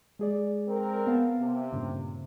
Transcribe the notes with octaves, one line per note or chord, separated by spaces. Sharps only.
G#3 G#4 D5
C4 A#4
B3 F5 A5
C3
G2 A#2 C#3